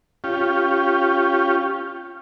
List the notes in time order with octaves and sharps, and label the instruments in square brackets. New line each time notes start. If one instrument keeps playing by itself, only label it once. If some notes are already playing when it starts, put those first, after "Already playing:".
[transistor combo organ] C#4 F4 G4